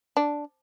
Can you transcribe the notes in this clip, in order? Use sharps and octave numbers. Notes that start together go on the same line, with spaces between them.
D4